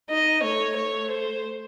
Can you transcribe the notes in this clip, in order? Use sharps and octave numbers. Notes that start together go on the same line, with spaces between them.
D#4 D#5
A3 C#5
A3 C#5
C5